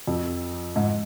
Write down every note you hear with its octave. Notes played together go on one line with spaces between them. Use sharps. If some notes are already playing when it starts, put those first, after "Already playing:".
F2
G#2